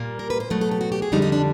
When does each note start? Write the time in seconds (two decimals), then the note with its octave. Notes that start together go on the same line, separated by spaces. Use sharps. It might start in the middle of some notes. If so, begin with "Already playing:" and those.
Already playing: A#2 G3 A#3
0.19 A#4
0.30 B4
0.40 C5
0.50 B2 F#3 A3 B4
0.61 A4
0.71 G4
0.81 F#4
0.92 G4
1.02 G#4
1.12 F2 D3 G3 D#4
1.22 D#4
1.32 D4